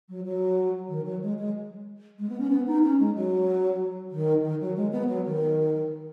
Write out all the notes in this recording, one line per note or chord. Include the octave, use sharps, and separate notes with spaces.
F#3
F#3
D#3
F#3
G#3
G#3
G#3
B3
C#4
B3
D#4
C#4
G#3
F#3
D#3
D#3
F#3
G#3
B3
F#3
D#3